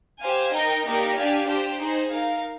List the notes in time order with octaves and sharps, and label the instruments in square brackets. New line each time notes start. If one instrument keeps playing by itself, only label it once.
[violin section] G4 C5 F5 G#5
D#4 A#4 D#5 G5
A#3 D#4 G4 A#4 D5
D4 G4 D5 F5 G#5
D4 G4 C5 G5
D#4 G#4 C5
D#4 A#4 F5